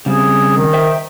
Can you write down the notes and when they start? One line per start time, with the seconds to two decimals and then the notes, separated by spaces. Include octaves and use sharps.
0.06 C#3 G3 C4 G#4
0.57 D#3
0.73 C5 E5 G5